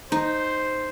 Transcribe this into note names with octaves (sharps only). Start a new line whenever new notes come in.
D#4 C5